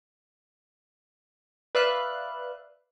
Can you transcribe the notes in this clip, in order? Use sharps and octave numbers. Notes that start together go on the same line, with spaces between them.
B4 D5 E5 F5 F#6